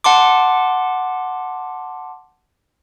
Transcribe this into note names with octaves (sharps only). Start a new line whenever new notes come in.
F#5 A5 C6 D6